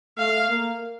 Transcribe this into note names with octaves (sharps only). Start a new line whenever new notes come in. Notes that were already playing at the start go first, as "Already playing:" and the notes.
A3 F5
A#3